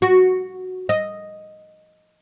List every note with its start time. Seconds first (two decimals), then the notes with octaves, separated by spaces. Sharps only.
0.02 F#4
0.89 D#5